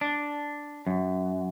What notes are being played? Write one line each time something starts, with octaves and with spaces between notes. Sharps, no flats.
D4
F#2